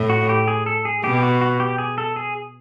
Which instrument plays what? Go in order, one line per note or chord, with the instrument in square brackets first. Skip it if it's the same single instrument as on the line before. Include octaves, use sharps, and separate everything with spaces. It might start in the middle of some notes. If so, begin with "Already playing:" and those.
Already playing: [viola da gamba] A2
[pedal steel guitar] F#4
G4
G#4
A4
G#4
[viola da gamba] B2 [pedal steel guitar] G4
[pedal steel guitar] G4
F#4
F#4
G4
G#4
A4
G#4